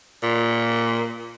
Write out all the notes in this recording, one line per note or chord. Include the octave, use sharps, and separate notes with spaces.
A#2